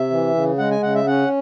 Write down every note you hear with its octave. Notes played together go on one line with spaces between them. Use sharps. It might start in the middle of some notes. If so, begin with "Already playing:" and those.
Already playing: C3 E5
E3
C#3
G#3 F#5
G#5
C#3 F#5
E5
C#4 F#5